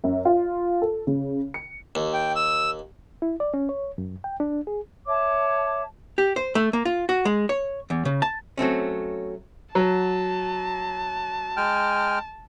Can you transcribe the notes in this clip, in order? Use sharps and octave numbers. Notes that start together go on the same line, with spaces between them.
F#2
F4
A4
C#3
C#7
D#2
G5
E6
E4
D5
C#4
C#5
F#2
G5
D4
G#4
C#5 E5 A5 D6
G4
C5
A3
A#3
F4
F#4
G#3
C#5
E2
C#3
A5
F#3 A3 C4 C#4
F#3 A5
G#3 G5 F6